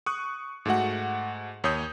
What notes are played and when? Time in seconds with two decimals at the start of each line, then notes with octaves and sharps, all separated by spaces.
0.06 C#6 D#6 F#6
0.66 G#2 A3 F#4 F#5
1.64 D#2 C#5 D#6 G6